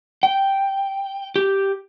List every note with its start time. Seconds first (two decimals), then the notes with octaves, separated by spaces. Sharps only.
0.23 G5
1.36 G4